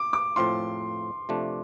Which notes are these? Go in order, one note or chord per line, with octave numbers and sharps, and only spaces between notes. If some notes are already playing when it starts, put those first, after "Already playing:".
Already playing: D6
D6
A2 F3 C4 F4 C6
C3 F3 A3 D4